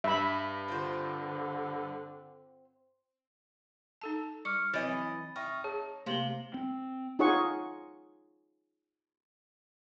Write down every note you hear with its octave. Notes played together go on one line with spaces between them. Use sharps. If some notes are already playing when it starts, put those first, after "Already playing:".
G2 E5 B5
D3 C4 F4 C5
D#4 A4 A5
G3 C#6 D6 F6 C#7
E3 F#3 C4 E4 C#5 D#5 A6
D#4 E5 G5 C#6 F6
G#4 C#5 A5
C3 A3 A#3 G4 F5 F#7 G7
C4
D#4 F4 G#4 C#5 F#5 C#6